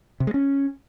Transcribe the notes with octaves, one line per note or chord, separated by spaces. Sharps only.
C3
G#3
C#4